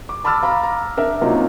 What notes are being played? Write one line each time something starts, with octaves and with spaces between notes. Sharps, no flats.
D6
A5 B5 D6 E6 F6 A6
F5 A#5 B5 D6
A#5
D4 A#4 E5
C3 F#3 A#3 C#4 D#4 F4